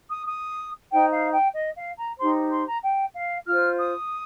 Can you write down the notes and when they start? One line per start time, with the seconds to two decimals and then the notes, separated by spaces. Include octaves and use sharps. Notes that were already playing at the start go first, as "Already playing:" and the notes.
0.10 D#6
0.26 D#6
0.90 D#4 C5 G5
1.11 F5
1.33 G5
1.54 D#5
1.76 F5
1.96 A#5
2.18 D#4 G4 C5 C6
2.50 C6
2.67 A#5
2.82 G5
3.15 F5
3.46 F4 F6
3.51 C5
3.78 D#6